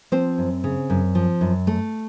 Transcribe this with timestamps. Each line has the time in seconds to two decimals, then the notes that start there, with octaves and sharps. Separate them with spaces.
0.12 F3 C4 C5
0.38 F#2
0.64 C#3
0.90 F#2
1.15 F3
1.41 F#2
1.67 A3